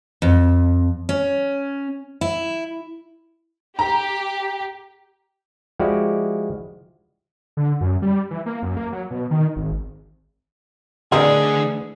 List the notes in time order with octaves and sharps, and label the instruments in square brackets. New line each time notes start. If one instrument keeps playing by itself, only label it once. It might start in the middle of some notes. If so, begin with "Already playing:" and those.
[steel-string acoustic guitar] F2
C#4
E4
[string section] G4 [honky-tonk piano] A#5
[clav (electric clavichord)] F3 G#3 E4 F#4 G4 D5
[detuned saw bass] D3
F#2
G3
E3
A#3
F#2
A#3
F#3
B2
D#3
G#1
[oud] D2 E3 D4 [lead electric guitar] D3 [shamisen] C4 D#4 A#4 [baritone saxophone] G#4